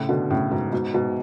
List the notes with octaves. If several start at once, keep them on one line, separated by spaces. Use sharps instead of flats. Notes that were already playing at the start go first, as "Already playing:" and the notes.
Already playing: A2 C#3
B2 D3
A2 C#3
G#2 B2
G#2 B2
G#2 B2